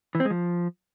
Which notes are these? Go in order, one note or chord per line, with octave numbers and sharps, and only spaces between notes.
E3
C4
G#3
F3